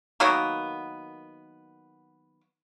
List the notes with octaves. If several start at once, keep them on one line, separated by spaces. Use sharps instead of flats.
D#3 F#3 A#3 B3